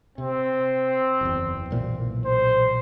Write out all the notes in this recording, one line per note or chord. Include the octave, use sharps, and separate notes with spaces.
C3 C4
F#1 E2
B1 A#2 E3
C5